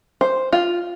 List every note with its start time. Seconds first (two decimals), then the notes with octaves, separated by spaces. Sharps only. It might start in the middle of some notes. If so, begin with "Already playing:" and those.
0.21 C5
0.52 F4